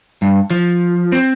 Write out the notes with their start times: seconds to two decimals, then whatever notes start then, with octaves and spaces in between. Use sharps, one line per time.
0.22 G2
0.51 F3
1.12 C4